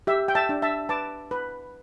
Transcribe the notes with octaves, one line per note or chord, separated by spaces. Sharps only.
G4 E5
G5
E5 A5
D4
E5 A5
B4 A5 D6
B4